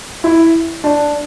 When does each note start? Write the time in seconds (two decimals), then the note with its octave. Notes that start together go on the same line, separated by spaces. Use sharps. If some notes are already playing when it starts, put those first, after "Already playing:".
0.24 E4
0.84 D4